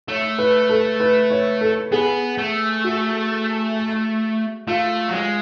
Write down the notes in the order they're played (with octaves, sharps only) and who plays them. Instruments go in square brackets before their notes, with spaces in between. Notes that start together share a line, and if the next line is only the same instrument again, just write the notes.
[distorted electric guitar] A3 [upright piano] C#5
[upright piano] B4
A4
B4
C#5
A4
[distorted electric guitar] B3 [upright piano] G#4
[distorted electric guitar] A3
[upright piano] F#4
[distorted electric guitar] A3 [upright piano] F4
[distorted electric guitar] F#3
G#3